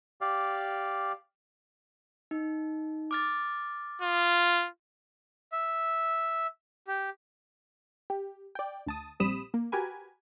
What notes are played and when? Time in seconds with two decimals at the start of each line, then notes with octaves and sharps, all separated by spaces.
0.21 G4 D5 F5
2.31 D#4
3.11 D6 F6 A6
4.02 F4
5.52 E5
6.88 G4
8.10 G4
8.55 D5 G5
8.87 D2 A5 D#6
9.20 A#1 G3 C4 B5 D#6 E7
9.54 A#3
9.72 F#4 G4 A#4 B4 G#5